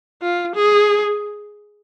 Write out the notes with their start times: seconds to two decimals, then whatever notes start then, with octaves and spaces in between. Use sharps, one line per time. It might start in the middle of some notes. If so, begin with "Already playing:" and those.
0.22 F4
0.55 G#4